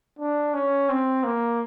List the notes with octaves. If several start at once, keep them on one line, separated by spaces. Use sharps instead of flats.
D4
C#4
C4
A#3